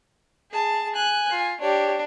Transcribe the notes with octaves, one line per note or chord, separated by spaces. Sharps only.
G#4 A5
G#5 F#6
F4
D4 G4 C#5